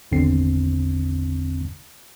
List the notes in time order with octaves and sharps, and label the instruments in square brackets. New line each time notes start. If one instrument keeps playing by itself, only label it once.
[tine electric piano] G#1 E2 D3 C4 C7